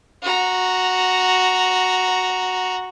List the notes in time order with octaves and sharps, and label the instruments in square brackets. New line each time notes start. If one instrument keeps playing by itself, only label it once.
[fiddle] F#4 A#5